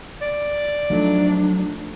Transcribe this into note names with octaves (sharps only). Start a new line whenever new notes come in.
D5
F3 F#3 A3 D4 D#4